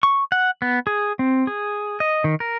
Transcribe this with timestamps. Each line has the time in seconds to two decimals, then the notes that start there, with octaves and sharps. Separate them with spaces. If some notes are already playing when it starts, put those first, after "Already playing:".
0.03 C#6
0.32 F#5
0.62 B3
0.87 G#4
1.19 C4
1.47 G#4
2.00 D#5
2.24 D#3
2.40 A#4